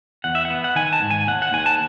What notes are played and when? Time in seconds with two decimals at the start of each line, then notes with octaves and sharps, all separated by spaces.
0.24 E2 F#5
0.35 E5
0.45 F#5
0.50 B3
0.64 F#5
0.75 D#3 G#5
0.93 A5
1.02 G#2
1.10 G#5
1.28 D#2 F#5
1.42 F#5
1.53 D#2 G#5
1.66 A5